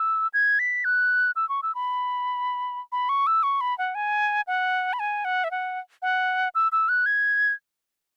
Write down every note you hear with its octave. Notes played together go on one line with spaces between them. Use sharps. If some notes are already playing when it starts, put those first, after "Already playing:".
Already playing: E6
G#6
B6
F#6
E6
C#6
E6
B5
B5
C#6
E6
C#6
B5
F#5
G#5
F#5
B5
G#5
F#5
E5
F#5
F#5
E6
E6
F#6
G#6